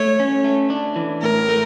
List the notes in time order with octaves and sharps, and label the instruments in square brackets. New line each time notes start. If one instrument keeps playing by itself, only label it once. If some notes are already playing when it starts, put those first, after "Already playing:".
Already playing: [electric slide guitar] A3 [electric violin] C#5
[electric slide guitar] C#4
A3
D4
E3
[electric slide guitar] A2 [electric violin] A#4
[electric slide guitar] A3